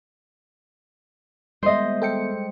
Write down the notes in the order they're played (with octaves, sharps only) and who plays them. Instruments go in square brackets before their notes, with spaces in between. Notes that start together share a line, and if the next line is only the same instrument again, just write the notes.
[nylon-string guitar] D#2 B3 E5 [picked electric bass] G3 G#3 [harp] C5 D#5
[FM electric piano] A4 G5 C#7